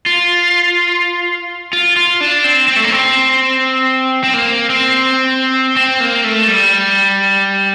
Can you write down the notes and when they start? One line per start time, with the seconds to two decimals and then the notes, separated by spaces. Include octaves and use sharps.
0.06 F4
1.73 F4
1.96 F4
2.21 D4
2.44 C4
2.68 C4
2.76 A3
2.84 A#3
2.92 C4
4.24 C4
4.34 A#3
4.70 C4
5.76 C4
6.00 A#3
6.24 A3
6.48 G3